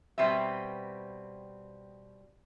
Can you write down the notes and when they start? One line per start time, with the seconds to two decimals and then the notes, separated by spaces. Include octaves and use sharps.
0.18 B2 G3 C4 B4 E5